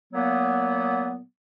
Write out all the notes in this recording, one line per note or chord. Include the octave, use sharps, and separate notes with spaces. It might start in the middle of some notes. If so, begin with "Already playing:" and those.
A#2 F#3 A#3 B3